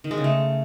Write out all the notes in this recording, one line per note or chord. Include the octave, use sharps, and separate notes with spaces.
D#3
G#3
C#3
A3